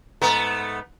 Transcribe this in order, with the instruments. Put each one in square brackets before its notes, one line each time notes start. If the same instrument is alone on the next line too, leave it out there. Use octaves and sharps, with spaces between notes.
[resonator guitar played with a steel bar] G#2 [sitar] A3 B3